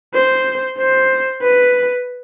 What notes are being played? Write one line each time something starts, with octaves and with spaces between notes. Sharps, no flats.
C5
C5
B4